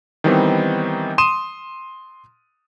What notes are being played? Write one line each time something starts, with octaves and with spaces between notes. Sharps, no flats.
D#3 E3 G3 B3 C4 D#4
C6 D#6 D#7 E7